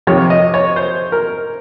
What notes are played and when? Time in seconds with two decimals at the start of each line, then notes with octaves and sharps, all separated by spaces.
0.07 F2 C3 D#3 C#5
0.30 D#5
0.54 C#5
0.76 C5
1.12 A#4